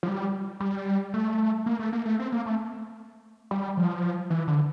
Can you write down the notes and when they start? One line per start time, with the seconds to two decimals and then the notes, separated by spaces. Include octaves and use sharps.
0.03 F3
0.08 G3
0.60 G3
1.14 A3
1.66 A#3
1.79 A3
1.93 A#3
2.06 A3
2.19 C4
2.32 A#3
2.46 A3
3.51 G3
3.77 F3
4.30 E3
4.48 D3